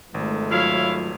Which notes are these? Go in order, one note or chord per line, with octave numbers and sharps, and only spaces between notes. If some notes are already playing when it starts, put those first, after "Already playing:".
G#1 F3 G#3 A3
F#3 E4 F4 C#5 F5